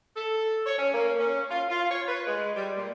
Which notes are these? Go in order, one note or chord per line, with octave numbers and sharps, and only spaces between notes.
A4
C#5
C#4
A#3
C#4
F4
F4
C#5
B4
G#3
G3
A#2